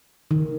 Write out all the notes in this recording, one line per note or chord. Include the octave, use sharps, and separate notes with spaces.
D#3